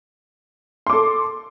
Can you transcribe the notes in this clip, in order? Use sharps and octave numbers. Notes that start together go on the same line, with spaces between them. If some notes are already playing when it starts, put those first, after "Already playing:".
A4 C6 D6